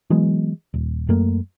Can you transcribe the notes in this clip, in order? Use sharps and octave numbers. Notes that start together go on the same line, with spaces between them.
E3 F#3 G#3 B3
D#1
F#2 A3 A#3